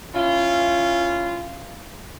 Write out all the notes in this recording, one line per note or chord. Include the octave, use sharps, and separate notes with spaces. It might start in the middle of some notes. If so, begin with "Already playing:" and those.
C#4 E4 F4